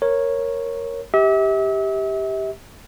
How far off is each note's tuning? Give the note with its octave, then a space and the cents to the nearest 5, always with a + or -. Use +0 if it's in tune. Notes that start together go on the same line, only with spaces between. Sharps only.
A#4 +0 C#5 -10
G4 +0 E5 -40